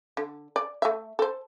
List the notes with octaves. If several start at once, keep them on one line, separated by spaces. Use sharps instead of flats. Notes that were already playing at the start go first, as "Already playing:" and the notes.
D3
D5
A3 E5
A4 C5